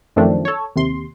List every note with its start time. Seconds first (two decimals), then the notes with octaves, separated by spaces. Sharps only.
0.16 F#2 D#3 F3 A3 C4 D4
0.45 A4 C#5
0.76 D#2 C3 C6